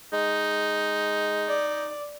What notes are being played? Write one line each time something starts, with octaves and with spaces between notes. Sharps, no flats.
G#3 D#4
D5